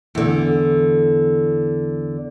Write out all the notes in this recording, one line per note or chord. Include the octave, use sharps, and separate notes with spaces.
E2 D3